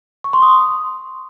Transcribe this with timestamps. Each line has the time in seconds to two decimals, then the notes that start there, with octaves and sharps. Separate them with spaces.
0.24 C#6
0.33 C6
0.42 D#6